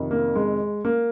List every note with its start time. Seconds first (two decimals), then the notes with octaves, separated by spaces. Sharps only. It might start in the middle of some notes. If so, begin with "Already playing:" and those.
Already playing: F2 C3 D#3
0.11 A#3
0.35 G#3
0.85 A#3